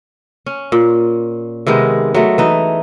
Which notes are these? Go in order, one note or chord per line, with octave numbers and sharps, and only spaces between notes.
C#4
A#2
C3 D#3 G#3 B3
F#3 G#3 A3
E3 D#4